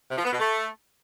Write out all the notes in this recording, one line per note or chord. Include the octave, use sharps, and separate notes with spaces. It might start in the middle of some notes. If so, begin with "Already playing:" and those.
C3
F3
B3
B2
A3